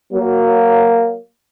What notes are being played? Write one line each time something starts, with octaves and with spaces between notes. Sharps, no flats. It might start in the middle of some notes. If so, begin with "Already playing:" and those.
F#3 A#3